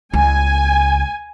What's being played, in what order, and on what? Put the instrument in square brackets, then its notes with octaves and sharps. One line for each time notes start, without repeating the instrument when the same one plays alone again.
[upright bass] C#2 [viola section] G#5